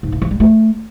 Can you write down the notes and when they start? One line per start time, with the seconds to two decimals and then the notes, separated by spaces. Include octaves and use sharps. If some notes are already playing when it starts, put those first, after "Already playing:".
0.03 G#2
0.12 E3
0.22 F3
0.31 G3
0.40 A3